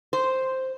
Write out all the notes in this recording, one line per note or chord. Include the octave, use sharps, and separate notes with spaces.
C5